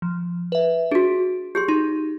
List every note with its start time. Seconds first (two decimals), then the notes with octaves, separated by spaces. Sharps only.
0.02 F3
0.52 B4 E5
0.91 D4 F#4 G#4
1.55 G4 G#4 C6 G6
1.68 D#4 C6